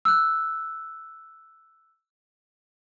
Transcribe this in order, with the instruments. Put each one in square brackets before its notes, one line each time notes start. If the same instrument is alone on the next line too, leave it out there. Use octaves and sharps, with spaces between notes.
[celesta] E6 F#6